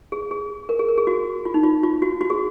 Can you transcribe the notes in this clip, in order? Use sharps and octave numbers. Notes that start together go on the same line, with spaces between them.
G#4
G#4
A#4
G#4
A#4
G#4
F#4
F4
D#4
F4
F4
F#4
F#4
G#4